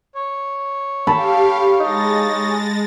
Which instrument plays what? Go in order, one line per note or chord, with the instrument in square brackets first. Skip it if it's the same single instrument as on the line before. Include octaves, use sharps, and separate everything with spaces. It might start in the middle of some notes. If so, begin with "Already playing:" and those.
[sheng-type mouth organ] C#5
[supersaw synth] G4 F5 [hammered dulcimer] A4 A5 B5
[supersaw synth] G#3 A6 A#6 [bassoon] D#4